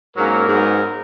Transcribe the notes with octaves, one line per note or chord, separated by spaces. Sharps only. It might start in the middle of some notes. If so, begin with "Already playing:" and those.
G#2 F#3 A#3 C#4 A#4
G#2 F#3 B3 D#4